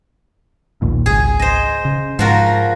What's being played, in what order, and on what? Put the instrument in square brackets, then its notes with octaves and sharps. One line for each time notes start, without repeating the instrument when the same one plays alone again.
[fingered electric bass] A#1 D#2 A#2
[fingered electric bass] G#1 C#2 [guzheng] G#4
[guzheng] C5 D#5
[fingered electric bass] C#3
[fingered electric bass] G#2 [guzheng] F3 F#4 A#4